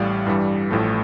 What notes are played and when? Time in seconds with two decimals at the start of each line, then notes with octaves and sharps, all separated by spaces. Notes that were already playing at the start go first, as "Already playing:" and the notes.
Already playing: A1 A2 G3 D5 F5
0.27 G2 E3 G3
0.71 A1 A2 F3 A3